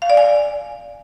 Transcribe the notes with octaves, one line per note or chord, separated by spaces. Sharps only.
F5
D5
G#5